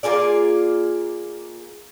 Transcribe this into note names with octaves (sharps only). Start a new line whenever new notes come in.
A#3 F4 G#4 D5